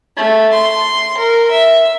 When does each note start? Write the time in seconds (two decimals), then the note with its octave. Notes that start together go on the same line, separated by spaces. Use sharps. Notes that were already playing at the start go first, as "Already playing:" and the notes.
0.17 A3
0.53 C6
1.18 A#4
1.51 E5